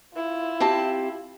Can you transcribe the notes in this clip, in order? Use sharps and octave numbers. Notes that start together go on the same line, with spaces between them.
E4 F4
C4 G4 A5